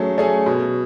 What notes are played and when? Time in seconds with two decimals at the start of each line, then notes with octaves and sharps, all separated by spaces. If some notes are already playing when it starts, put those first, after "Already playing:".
Already playing: F#3 A3 C#4 G#4
0.18 A3 C#4 G#4
0.46 B2